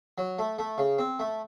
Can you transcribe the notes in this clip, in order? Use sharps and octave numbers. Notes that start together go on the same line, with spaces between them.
F#3
A3
A3
C#3
C4
A3